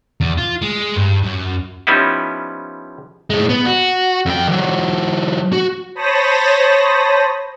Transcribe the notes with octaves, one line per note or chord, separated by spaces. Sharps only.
E2
F4
G#3
G2
F#2
F3 G3 B3 C#4 D#4 E4
A2 G#3
B3
F#4
F2 G5
E3 F#3
F#4
C5 C#5 A5 B5 D#6 A#6